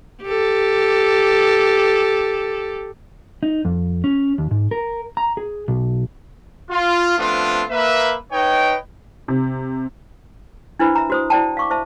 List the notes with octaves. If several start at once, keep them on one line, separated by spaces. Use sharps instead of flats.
G4 A4
D#4
F2
C#4
D#2
G#2
A#4
A#5
G#4
B1
F4
F3 A3 B3 C4 D4 F4
A#3 B4 E5
D#4 B4 C#5 D#5 G5
C3
D4 E4 B4 C5 B5
E5 A#5
F#4 C5 D#6
E4 C5 D5 G5 A5
F5 C#6 D6
C5 E5 A5